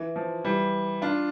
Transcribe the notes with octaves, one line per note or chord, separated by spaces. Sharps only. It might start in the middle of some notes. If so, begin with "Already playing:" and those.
Already playing: E3
F3
E3 G3
D4 F4